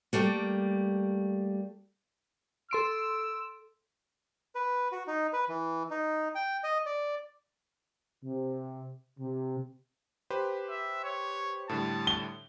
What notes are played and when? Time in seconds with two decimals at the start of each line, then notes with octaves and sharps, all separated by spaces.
0.13 G3 A3 A#3
2.71 A4 C6 E6 D7
4.55 B4
4.92 F#4
5.07 D#4
5.33 B4
5.48 E3
5.90 D#4
6.35 G5
6.64 D#5
6.86 D5
8.24 C3
9.19 C3
10.30 G4 B4 C5
10.70 E5
11.04 C#5
11.69 A2 D3 G3 A5
12.07 G7